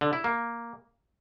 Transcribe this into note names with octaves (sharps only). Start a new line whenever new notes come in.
D3
E4
A#3